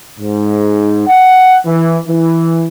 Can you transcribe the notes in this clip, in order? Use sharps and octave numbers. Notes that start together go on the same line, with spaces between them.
G#2
F#5
E3
E3